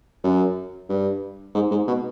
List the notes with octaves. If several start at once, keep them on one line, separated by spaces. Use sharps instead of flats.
F#2
G2
G#2
G#2
B2